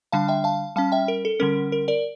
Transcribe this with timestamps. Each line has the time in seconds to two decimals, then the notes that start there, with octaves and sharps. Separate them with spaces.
0.12 D3 G3 D4 F5 A5
0.28 E5 G5
0.44 F5 A5
0.76 G3 C#4 F5 A5
0.92 E5 G5
1.08 A#4
1.25 A4
1.40 D3 G3 C#4 A#4
1.72 A#4
1.88 A#4 D5